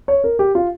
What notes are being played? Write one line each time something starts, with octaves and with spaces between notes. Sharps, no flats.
C#5
A#4
G4
F4